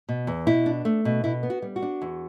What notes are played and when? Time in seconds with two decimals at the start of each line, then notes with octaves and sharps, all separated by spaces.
0.09 B2
0.27 E2
0.47 B2 E4
0.66 D4
0.85 A3
1.05 B2
1.24 B2 E4
1.43 B3
1.50 F#4
1.62 G3
1.76 F#4
1.82 D4
2.02 E2